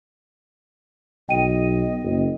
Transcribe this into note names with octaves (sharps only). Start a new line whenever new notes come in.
B1 D#5 G5 D#7
F#1